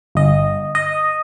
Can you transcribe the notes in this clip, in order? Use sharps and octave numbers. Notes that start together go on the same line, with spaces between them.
G1 D#5
D#5